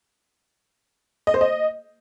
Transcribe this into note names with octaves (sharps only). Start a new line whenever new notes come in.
D#5
C5
D#5